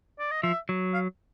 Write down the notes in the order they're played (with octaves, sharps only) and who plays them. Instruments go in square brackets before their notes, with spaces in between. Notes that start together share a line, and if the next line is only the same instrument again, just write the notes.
[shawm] D5
D#5
[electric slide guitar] F3 [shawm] E5
[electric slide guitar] F#3
[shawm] F5